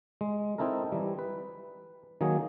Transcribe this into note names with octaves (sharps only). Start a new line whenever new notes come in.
G#3
C4 D#4 E4 A4 A#4
E3 G3
B4
D#3 F#3 A#3 G#4